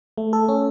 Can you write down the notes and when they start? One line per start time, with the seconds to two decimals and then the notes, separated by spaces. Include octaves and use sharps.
0.18 A3
0.33 A4
0.49 C#4